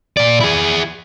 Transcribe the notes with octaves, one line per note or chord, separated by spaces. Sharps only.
A#2 D5
E4 G#4